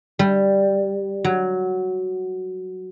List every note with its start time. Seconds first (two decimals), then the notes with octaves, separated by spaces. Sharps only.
0.19 G3
1.24 F#3